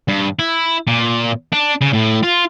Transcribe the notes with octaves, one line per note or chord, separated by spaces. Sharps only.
G2
E4
A#2
D4
C#3
A2
F4